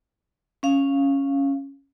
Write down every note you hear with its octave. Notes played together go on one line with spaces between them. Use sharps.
C#4 F5